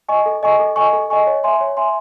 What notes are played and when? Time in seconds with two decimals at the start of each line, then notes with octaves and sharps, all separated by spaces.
0.09 D#5 G#5 C#6
0.26 A4
0.43 D#5 G#5 C#6
0.59 A4
0.76 D#5 G#5 C#6
0.93 A4
1.10 D#5 G#5 C#6
1.27 C#5
1.44 E5 G#5 C6
1.61 C#5
1.77 E5 G#5 C6